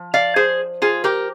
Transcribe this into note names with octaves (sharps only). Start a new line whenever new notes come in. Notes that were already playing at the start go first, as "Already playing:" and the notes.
Already playing: F3
D5 F5
G#4 C5
F4 G#4
G4 A#4